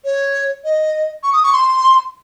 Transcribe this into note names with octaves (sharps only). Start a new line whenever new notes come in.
C#5
D#5
C#6
D#6
C#6
C6